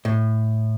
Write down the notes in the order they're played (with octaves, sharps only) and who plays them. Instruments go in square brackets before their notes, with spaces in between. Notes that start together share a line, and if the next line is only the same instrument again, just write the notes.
[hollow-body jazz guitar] A2